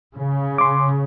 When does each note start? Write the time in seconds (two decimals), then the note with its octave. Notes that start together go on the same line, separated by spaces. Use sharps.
0.17 C#3
0.58 C6 D6